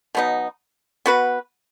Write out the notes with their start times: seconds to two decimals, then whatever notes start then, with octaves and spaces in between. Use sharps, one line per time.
0.15 B2 F#3 B3 D#4
1.06 B3 F#4 B4